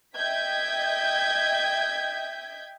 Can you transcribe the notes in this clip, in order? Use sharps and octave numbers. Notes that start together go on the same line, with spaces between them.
D#5 E5 G5 G6 G#6 B6